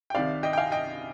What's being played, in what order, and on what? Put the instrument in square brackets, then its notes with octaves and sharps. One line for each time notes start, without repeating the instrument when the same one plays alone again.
[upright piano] G5
C2 C3 D#3 D5 F5
D#5 G5
G5
F5 G#5
D#5 G5